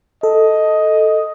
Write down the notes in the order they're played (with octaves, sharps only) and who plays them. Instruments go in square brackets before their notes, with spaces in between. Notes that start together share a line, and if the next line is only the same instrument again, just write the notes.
[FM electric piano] A4 [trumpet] D#5